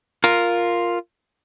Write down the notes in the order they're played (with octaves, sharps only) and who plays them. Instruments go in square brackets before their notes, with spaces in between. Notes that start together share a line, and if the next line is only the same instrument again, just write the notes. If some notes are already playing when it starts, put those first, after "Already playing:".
[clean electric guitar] F4 A#4